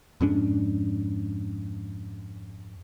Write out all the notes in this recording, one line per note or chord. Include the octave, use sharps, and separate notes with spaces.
F2 G#2 C#4 D4